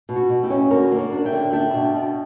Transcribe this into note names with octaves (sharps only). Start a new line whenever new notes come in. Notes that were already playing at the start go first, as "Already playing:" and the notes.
B2
F#4
B2
E4 G4
C#4
D3 F#4 A#4
A#3
F#4 A#4
D4
E5 G5
D3
D4 E5 G5
B2
B2